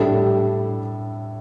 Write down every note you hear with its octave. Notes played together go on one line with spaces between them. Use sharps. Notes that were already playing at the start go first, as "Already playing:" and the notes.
Already playing: A2 G3 D4 A4